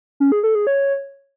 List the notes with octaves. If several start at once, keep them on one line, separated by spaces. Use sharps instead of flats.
C#4
G#4
A4
G#4
C#5